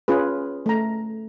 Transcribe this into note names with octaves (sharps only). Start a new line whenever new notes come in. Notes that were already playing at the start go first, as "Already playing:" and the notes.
C#4 F4 G#4 B4
A3 A#5